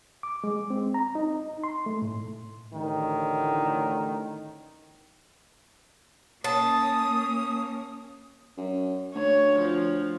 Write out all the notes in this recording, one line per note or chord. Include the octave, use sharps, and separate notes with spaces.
D6
G#3
C4
A#5
D#4
C6
A3
A2
A1 A2 D3 D#3
A#3 C#4 A5 D#6
F#2
D2 C#5
F3